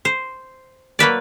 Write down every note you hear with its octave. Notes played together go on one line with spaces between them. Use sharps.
C5
F#3 A#3 B4 D5